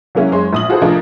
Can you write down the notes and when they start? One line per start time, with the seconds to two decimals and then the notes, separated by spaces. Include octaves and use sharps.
0.15 F#3 G#3 A#3 C#4 E4
0.32 F#1 G#3 C#5 C6
0.53 A#1 D#6 F#7
0.69 F4 F#4 G#4 A4 B4 C5
0.82 F3 A3 D4 G#4 A#4 D#5